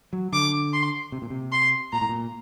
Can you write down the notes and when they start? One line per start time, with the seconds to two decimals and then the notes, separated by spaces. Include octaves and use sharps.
0.13 F#3
0.32 D3 D6
0.73 C6
1.12 C3
1.22 A#2
1.30 C3
1.52 C6
1.93 A#2 A#5
2.01 A2
2.09 A#2